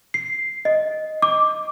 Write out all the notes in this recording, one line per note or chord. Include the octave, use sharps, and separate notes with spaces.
C7
D#5
D6